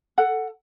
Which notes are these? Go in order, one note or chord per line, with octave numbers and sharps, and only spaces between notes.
A4 F#5